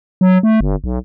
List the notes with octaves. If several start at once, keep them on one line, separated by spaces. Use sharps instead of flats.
F#3
A3
G1
B1